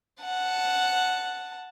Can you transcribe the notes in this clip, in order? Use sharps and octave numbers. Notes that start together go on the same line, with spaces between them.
F#5 A5